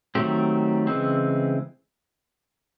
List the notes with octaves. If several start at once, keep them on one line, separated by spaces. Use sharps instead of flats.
D#3 F#3 A3 C4 G4
C#3 E3 G#3 C4